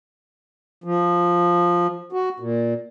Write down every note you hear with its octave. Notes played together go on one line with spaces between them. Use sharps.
F3
F#4
A#2